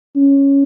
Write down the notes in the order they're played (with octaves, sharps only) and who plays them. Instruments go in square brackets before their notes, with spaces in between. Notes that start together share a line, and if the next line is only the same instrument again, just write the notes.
[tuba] C#4